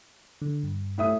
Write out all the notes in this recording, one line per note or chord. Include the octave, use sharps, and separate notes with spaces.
D3
G2
A2 E5 D#6